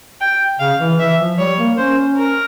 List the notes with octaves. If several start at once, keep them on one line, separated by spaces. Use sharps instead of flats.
G5
C#3 F5
E3
E3 E5
F3
G3 C#5
A#3
C#4 C5
A#4